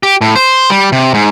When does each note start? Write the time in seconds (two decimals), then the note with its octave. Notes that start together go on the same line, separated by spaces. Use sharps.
0.03 G4
0.21 A2
0.36 C5
0.70 G3
0.92 C3
1.14 G#2